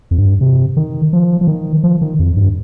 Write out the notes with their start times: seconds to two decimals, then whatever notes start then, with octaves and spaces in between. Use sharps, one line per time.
0.11 F2
0.18 G2
0.41 C3
0.77 D#3
1.13 F3
1.41 F3
1.47 D#3
1.83 F3
2.01 D#3
2.19 F2
2.37 G2